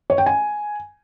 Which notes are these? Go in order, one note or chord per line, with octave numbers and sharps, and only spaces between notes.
C#5
G5
G#5